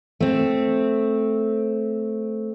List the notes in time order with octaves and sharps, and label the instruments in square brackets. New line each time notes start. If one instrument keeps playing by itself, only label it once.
[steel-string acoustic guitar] A3 C4